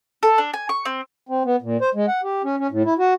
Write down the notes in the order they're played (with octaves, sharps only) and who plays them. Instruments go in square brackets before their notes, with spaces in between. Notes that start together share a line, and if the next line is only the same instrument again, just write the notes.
[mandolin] A4
D4
G#5
C#6
C4
[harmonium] C4
B3
A#2
C5
G#3
F#5
G4
C#4
C#4
A2
E4
F#4